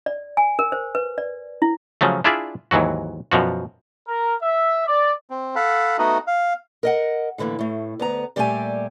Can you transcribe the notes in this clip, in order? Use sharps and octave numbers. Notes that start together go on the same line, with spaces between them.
D5
G#5
A#4
C5
B4
D5
E4
C#3 F3 F#3 A3
D4 E4 F4 G#4 D5 E5
D#2 G#2 E3 F#3 F#4
F#2 B2 F3 F#4
A#4
E5
D5
C4
A4 F5 F#5 B5
A3 B3 D#4 F#4 D#5
F5
A#4 D#5 F#5
A2 D3 E3 G#3 A#3
A2 A3
D2 B3 A#5
A#2 G3 A3 G4 C5 G#5